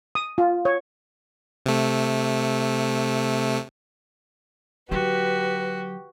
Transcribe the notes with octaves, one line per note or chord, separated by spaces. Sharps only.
D#6
F4
C#5
C3 A3
D3 F#3 F#4 G4 B4